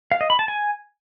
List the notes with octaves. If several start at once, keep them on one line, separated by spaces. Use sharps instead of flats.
F5
D#5
B5
A5
G#5